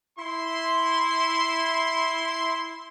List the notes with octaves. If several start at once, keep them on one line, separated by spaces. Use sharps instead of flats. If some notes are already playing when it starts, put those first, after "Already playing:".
E4 C6